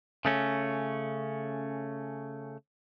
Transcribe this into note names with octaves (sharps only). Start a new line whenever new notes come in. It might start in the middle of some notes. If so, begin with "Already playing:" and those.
C#3 A3 C#4